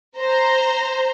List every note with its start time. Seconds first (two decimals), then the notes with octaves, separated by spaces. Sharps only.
0.18 C5 A#5